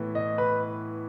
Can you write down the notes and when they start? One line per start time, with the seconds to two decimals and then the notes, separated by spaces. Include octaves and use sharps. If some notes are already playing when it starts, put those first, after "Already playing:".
Already playing: A2 E3 B3
0.15 D#5
0.38 B4